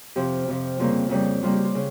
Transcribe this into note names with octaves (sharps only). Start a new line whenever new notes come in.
F2 C3 F3 G4
F2 C3 F3
F2 C#3 G3 A#3 F4
F2 C#3 G3 A#3
C#3 G3 A#3 F4
G4
F4
C#3